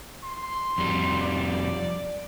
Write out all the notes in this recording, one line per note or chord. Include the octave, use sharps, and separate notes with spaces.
C6
F2 G3
D5